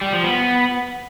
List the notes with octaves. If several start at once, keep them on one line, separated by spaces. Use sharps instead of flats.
G3
F3
B3